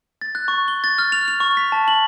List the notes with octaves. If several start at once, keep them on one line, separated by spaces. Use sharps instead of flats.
A6
F#6
C#6
G7
A6
F6
F7
F7
C#6
B6
A5
F#7